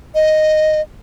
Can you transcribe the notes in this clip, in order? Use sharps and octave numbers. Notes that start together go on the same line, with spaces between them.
D#5